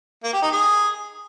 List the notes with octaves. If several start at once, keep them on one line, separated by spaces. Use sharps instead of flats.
A#3
G4
D#4
G#4